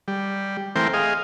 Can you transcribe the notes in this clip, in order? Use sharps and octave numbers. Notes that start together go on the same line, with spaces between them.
G3
E3 A3 C4 A#4 C5 G5
G#4 D#5 F5